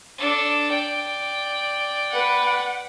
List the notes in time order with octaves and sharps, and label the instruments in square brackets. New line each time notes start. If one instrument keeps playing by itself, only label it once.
[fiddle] D4 A4
D5 G5
[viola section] B4 F#5